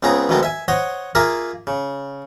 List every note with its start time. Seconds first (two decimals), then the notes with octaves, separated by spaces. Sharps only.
0.03 C#2 C#3 B3 C4 G#4 A#5
0.29 D2 B2 D#3 G#3 B3 C4
0.43 E5 G#5
0.68 C5 C#5 D#5 F#5
1.15 A#3 F4 G#4 A#4 E5 D#6
1.67 C#3